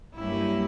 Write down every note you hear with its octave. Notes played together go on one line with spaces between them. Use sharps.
G2 F#3 A#3 C#4 E4 G4